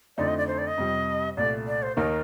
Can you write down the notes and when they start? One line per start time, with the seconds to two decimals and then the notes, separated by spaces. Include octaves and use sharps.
0.17 F2 D3 A3 C4 D#4 D5
0.28 D#5
0.38 D5
0.47 C5
0.58 D5
0.67 D#5
0.78 F2 C3 G3
1.37 C2 A#2 A3 D5
1.67 D5
1.83 C5
1.97 D#2 D#3 A#3 D#4 A#4